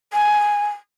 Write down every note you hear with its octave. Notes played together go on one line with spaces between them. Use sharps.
G#5